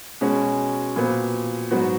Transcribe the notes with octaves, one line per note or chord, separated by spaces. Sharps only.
B2 G#3 C#4 F#4
A#2 F3 B3 F#4
G#2 F#3 B3 F#4